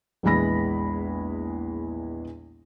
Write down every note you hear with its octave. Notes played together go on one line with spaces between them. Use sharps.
A#1 E2 E3 G#3 B5 A#6